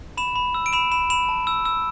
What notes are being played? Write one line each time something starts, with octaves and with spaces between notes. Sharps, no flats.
B5 E7
B5
E6
D7
B5 E7
B5 E7
B5 E7
A5
E6
E6